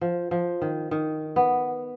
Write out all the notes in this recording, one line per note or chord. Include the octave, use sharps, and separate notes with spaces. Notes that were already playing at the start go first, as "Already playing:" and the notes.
F3
F3
D#3
D#3
B3